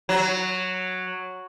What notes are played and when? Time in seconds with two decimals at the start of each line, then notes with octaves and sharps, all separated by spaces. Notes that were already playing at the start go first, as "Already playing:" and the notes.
0.09 F#3